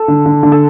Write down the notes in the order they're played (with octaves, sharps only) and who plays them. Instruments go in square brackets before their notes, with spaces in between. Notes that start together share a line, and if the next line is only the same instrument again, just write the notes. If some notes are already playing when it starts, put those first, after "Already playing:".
Already playing: [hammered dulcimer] A4
[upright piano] D3
D3
D3
[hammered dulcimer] A4